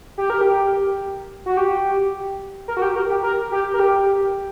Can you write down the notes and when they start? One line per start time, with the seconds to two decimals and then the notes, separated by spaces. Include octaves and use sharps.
0.18 G4
0.30 A#4
0.41 G4
1.46 F#4
1.57 G4
2.68 A#4
2.77 F#4
2.82 G4
2.96 A#4
3.10 G4
3.23 A#4
3.52 G4
3.74 A#4
3.80 G4